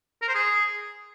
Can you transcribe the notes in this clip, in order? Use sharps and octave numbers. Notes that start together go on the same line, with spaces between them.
A#4
C5
G#4